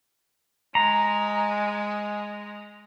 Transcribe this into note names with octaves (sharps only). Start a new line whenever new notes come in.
G#3 A#5